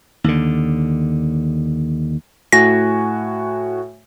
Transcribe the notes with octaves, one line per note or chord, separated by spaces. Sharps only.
D#2 D3
A2 F#4 G#5 A#6